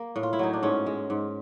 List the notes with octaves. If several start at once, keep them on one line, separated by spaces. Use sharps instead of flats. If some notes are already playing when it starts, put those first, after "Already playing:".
Already playing: A#3
A2
F4
E4
F#3 D#4
D4
G#2 C#4
G#3
G#2